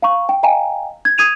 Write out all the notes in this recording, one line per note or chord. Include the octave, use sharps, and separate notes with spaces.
F5 A#5 C#6
G5
D#5 F5 G5 G#5 A#5
G#6
D#6 G#6 D#7 F7